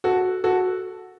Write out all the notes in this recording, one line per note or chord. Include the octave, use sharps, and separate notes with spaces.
F#4 A4
F#4 A4